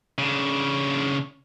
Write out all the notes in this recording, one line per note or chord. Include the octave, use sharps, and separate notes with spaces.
C#3 D4